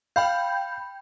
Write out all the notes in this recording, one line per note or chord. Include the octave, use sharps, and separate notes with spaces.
F5 G5 B5 G6